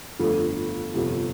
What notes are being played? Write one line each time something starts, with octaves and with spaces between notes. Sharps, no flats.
G1 F2 D3 A3
G1 F2 C3